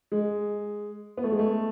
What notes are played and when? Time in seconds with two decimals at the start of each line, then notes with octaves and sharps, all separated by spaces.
0.12 G#3
1.17 B3
1.24 A3
1.32 G#3
1.39 A3